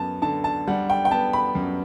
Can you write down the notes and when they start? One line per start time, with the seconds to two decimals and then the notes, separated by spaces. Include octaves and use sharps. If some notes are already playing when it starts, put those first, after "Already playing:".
Already playing: F#2 B3 A5
0.22 D3 A5
0.44 A5
0.67 G3 F#5
0.90 G5
1.05 G5
1.11 B3 A5
1.33 B5
1.55 F#2